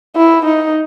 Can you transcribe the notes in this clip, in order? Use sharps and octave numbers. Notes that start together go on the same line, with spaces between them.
E4
D#4